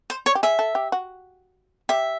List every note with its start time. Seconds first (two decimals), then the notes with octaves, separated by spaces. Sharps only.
0.10 C5
0.26 C#5
0.35 G4
0.43 G#4 E5
0.59 A4
0.75 G4
0.92 F#4
1.89 G4 E5